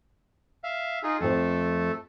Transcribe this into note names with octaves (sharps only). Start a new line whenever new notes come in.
E5 F5
D#4 F4 G#4
F2 F3 A3 A4